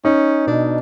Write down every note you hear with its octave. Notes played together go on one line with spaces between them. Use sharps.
C#4 D#4
B2 D4